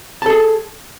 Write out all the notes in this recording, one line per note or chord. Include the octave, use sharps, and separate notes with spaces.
G#4 A4 A5